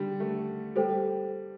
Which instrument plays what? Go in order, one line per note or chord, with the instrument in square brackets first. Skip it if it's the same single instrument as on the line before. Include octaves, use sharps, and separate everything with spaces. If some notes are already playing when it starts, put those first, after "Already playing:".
Already playing: [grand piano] D3 G3
A3
[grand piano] G3 [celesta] A4 C5 G5